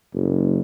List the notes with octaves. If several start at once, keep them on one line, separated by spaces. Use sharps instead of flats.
F#1